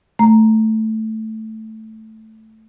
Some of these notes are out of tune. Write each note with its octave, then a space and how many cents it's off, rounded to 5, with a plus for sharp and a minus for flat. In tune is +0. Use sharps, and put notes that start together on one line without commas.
A3 +0 A#5 +0